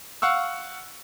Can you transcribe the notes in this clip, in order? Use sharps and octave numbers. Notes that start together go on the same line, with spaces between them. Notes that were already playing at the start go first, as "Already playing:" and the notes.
F5 F#5 C#6 E6